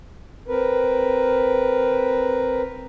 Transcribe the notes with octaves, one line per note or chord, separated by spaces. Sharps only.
C4 A#4 B4